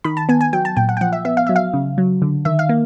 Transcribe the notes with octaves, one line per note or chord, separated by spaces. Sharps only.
D#3 B5
A5
B3 G#5
G#5
F#3 G5
A5
A#2 G5
F#5
G5
F3 F#5
E5
B3 E5
F5
F#3 E5
F5
C#3
F#3
D3
D#3 E5
F5
A#3